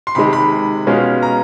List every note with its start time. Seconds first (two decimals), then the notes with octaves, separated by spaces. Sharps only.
0.07 C6
0.15 C3 D#3 G#3 B5
0.33 B5
0.87 B2 G#3 C#4 F4
1.23 A#5